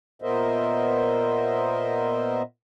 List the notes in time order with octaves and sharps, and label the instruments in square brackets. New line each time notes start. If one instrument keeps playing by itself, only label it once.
[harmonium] A#2 B3 A#4 C5 D#5 E5